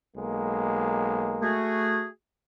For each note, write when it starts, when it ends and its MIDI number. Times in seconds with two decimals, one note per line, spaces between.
0.15 1.65 35
0.15 1.65 56
0.15 1.65 58
1.43 2.07 57
1.43 2.07 66
1.43 2.07 68